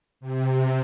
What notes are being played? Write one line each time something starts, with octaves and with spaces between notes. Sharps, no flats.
C3